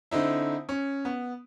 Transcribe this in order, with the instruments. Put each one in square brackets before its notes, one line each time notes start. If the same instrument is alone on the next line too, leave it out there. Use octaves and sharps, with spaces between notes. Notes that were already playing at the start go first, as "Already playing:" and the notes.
[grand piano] D3 C4 D#4 E4
C#4
B3